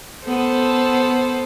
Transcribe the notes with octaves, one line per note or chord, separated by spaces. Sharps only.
B3 A4 C5